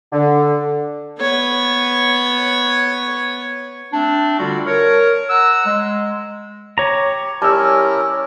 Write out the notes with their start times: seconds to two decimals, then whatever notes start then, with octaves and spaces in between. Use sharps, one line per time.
0.13 D3
1.19 B3 C#5
3.93 A3 C4 D4
4.39 D3 G3 F4 F#4
4.67 A#4 C#5
5.30 F#5 A#5 E6
5.67 G#3
6.78 G4 C#5 A#5
7.42 G3 C#4 E4 A#4 A5 E6